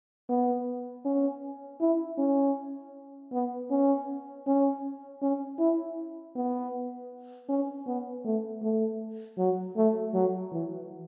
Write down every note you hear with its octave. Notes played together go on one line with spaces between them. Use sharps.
B3
C#4
E4
C#4
B3
C#4
C#4
C#4
E4
B3
C#4
B3
A3
A3
F#3
A3
F#3
E3